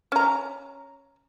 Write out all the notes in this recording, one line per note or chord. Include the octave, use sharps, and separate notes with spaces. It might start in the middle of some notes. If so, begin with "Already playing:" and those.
C#4 A#5